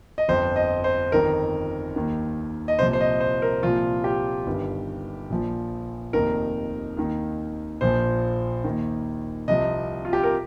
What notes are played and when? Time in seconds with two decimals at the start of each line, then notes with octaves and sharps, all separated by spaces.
0.18 D#5
0.28 G1 F2 F3 C5
0.56 D#5
0.84 C5
1.12 G1 F2 D#3 A#4
1.96 D#2 D#3
2.68 D#5
2.79 C2 A#2 F3 C5
2.93 C5
3.01 D#5
3.20 C5
3.42 A#4
3.62 C2 A#2 F3 F4
4.04 G4
4.46 G1 G2 D#3
5.30 A#1 A#2 F3
6.13 F1 D#2 D#3 A#4
6.97 D#2 D#3
7.81 A#1 A#2 F3 C5
8.64 D#2 D#3
9.48 C2 C3 F3 D#5
10.05 F4
10.13 G4
10.23 A#4